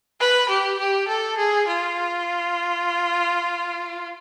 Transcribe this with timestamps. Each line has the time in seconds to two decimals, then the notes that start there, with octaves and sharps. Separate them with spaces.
0.20 B4
0.49 G4
0.79 G4
1.08 A4
1.37 G#4
1.67 F4